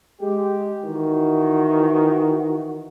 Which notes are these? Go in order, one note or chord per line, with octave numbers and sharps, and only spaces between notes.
G#3 G4
D#3 E3 F#4